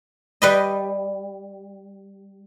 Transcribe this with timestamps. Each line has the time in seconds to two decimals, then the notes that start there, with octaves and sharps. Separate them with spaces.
0.42 G3 B4 D#5